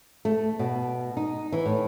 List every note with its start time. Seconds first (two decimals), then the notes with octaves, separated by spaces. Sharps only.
0.25 A3
0.59 B2
1.17 D#4
1.52 E3
1.66 A2